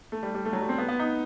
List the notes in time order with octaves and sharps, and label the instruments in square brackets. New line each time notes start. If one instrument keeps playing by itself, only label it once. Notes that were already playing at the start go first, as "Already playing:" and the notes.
[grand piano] A3
G3
G3
A3
F#3
G3
C4
B3
B3
D#4